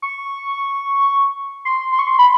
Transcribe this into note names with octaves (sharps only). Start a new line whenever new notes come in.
C#6
C6
C6
C#6
C6
B5